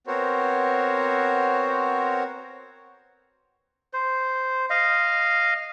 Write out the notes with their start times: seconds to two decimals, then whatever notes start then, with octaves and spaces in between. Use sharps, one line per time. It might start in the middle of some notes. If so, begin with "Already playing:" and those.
0.07 B3 C4 F#4 A#4 C5 C#5
3.93 C5
4.70 D#5 F5